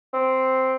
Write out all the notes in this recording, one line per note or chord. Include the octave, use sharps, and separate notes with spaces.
C4